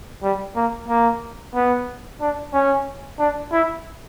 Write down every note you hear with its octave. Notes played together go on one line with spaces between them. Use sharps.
G3
A#3
A#3
B3
D4
C#4
D4
E4